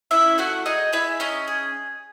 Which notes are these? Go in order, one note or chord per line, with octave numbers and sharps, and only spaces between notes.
C#4 E4 E5
A3 F#4 F#5
D#4 G#4 D#5
E4 G#4 E5
C#4 D#4 D#5
G#4